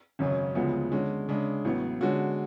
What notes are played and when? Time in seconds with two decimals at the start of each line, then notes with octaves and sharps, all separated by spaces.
0.19 G#1 F#2 C#3 F#3 C#4
0.55 D2 C#3 F3 G#3 B3
0.92 D3 G#3 C#4
1.29 C#3 G#3 D4
1.65 A1 A2 F#3 B3
2.01 D3 G#3 C#4 F#4